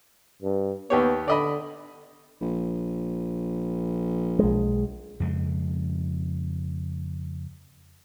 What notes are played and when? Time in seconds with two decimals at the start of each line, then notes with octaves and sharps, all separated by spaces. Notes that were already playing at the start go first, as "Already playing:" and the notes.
0.42 G2
0.90 D#2 B3 G4 C#5
1.28 D3 D5 D#5 B5
2.41 A#1
4.39 B1 G#3
5.20 F2 C#3 G#3